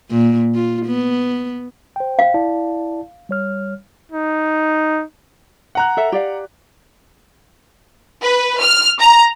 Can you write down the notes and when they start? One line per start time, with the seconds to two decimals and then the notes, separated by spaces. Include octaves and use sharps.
0.10 A#2
0.55 F4
0.86 B3
1.96 C5 G5
2.19 F5
2.34 E4 D5 A5
3.29 G3 C#5 F6
4.12 D#4
5.75 F#5 A#5 F#6
5.97 A4 E5
6.12 G4 D5 F5
8.21 B4
8.60 F6
8.99 A#5